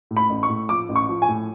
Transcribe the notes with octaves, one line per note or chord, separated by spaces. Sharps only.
A2
B5
A1
C#6
A2
F3 D6
A1
C#6
F3
G#5
A2